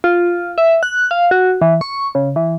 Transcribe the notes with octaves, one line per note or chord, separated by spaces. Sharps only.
F4
E5
F#6
F5
F#4
E3
C#6
C#3
E3